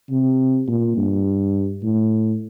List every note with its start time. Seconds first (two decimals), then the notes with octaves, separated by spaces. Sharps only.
0.10 C3
0.68 A#2
0.97 G2
1.83 A2